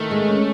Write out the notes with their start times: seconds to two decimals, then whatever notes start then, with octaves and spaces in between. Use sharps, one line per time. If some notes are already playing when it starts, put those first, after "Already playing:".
Already playing: D#3 A3
0.11 G#3
0.28 C#4